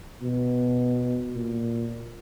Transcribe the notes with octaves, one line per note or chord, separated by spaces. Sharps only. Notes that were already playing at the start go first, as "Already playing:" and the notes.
B2
A#2